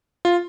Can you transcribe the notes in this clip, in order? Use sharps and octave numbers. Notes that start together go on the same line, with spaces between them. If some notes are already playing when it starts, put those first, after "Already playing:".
F4